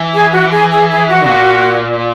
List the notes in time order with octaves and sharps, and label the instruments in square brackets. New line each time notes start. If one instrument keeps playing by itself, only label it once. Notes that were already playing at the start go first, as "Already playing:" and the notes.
Already playing: [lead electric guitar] E3
[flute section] G#4
F#4
G#4
G#4
G#4
F#4
[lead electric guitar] A#2